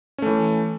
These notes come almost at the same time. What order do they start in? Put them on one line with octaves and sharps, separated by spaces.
C#4 A3 E3